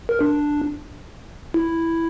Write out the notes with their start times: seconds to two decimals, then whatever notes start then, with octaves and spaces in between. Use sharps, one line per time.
0.09 A#4
0.21 D4
1.54 E4